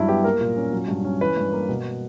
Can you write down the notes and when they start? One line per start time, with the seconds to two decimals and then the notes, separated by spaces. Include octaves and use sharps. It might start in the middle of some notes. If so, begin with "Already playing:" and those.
Already playing: G2 F#3 E4
0.08 B3 G4
0.24 A#3 A#4
0.41 A#2
0.57 C#4
0.72 F#3
0.88 G2
1.05 C#4
1.21 E3 B4
1.37 G2
1.53 A#3
1.69 B2